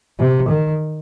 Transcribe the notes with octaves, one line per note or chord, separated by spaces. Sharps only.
C3
D#3